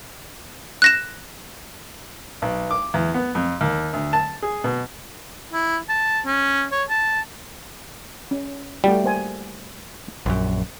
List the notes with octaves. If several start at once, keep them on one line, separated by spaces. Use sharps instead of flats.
F#6 A#6 E7
B1
D6
E2
B3
F2
D#2
D2
A5
G#4
B2
E4
A5
C#4
C#5
A5
C#4
G3 A3 F#4 G5
A#3 C5 G#5
A#1 F#2